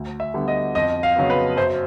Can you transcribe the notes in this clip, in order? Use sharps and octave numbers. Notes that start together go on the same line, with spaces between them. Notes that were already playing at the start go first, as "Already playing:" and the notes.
Already playing: D2
E5
D3 G3 B3
D#5
F2 D#5
F5
C#3 F#3 B3
B4
F#2 C5